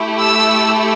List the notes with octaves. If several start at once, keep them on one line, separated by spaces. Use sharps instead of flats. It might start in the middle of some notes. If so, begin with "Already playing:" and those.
Already playing: A3 E4 G4
E6